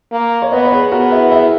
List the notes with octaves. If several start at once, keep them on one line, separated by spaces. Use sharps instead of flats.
A#3
C#5
B3 B4 D#5
C#5
G#4 B4
B3 F#4 A#4
E4 G#4
E4 G#4